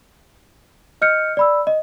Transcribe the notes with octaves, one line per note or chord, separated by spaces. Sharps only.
D#5 F6 G6 C#7
D5 B5 E6
D#5